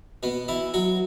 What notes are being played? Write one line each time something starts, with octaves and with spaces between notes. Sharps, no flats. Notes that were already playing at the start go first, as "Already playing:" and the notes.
B2 B3
E3 E4
F#3 F#4